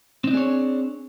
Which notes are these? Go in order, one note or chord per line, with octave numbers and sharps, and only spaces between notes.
C4 D4 D#4 G#4 C#5